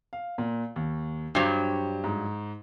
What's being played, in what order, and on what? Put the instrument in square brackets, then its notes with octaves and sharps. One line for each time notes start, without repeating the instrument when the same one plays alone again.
[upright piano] F5
A#2
D#2
[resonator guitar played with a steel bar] G2 F#3 [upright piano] G4 C5
[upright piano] G#2